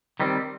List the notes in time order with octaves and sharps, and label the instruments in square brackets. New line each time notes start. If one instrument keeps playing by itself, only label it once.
[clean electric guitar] D#3 G3 C4